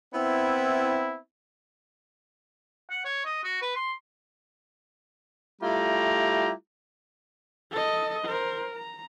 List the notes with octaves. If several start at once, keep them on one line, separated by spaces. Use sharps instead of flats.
B3 C4 E4
F#5
C#5
D#5
F#4
B4
C6
G3 A3 E4 F4 G4 A#5
A4 D#5
A#4 C5
A#5